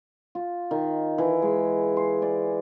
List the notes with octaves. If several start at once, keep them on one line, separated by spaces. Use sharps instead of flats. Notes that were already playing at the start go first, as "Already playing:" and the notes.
F4
D#3
E3
G#3
C6
D5